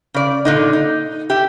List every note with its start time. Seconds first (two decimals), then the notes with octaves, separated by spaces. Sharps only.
0.14 C#3 D5
0.45 A#2 D3 D#4
0.73 D#4
1.30 G4 E5